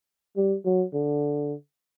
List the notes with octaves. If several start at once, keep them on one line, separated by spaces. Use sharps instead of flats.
G3
F#3
D3